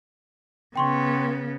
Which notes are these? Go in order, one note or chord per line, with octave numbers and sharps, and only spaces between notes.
C#3 B3 G5 C6 C#6